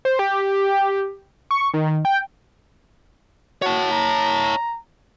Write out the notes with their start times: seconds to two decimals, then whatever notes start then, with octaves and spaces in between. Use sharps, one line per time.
0.05 C5
0.19 G4
1.51 C#6
1.74 D#3
2.05 G5
3.62 F#4 C#5 A5
3.92 A#5